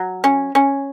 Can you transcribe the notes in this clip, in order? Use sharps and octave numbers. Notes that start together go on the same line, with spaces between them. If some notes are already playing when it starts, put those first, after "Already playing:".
Already playing: F#3
C#4
C#4